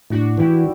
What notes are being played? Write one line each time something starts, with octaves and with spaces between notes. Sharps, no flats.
A2 D4 F#4
E3 E4 G4